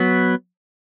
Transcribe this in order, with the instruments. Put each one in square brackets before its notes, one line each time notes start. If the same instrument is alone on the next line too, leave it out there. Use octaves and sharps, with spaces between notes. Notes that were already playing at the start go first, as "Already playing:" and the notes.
Already playing: [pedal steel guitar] F#3 B3